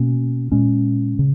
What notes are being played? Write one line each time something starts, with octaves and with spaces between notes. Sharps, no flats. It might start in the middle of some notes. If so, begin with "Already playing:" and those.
Already playing: B2 A#3 C#4
A#2 G#3 C#4
C#3